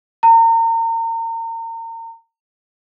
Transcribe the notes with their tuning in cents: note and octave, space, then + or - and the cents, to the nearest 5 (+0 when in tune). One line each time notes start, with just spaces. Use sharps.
A#5 -35